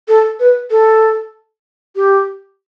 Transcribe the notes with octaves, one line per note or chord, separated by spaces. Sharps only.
A4
B4
A4
G4